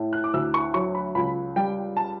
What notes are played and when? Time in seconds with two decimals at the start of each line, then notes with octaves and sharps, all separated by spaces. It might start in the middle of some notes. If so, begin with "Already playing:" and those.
Already playing: A2
0.13 F#6
0.24 D6
0.34 D2 E6
0.54 C#6
0.74 F#3 C#6
0.95 B5
1.15 C#2 B5
1.56 G3 G5
1.97 A5